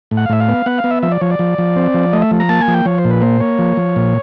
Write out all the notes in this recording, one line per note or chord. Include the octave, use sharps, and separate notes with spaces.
A2
F#5
F5
A2 E5
F5
B3
B3 F#5
F5
B3
E5
F3 E5
D5
F3 C#5
D5
F3
F3
C4
F3
A3 D#5
E5
F3
A#5
A#3 A5
G#5
F3
G5
F3 C#5
C5
A#2
B4
A#3 C5
A#3 C#5
F3
F3
A#2